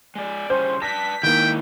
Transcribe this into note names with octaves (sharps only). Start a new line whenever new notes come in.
G#3 D5
C#3 G3 C#4 C5 G6
B4 D5 A5 A#6 B6
D#3 F#3 G#3 A#3 E4 G5